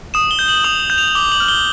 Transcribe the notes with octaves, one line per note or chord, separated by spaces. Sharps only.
D#6 E7
G7
G6
F#7
D#6 F7
G6
F7
D6 G7
F#7
F6
G7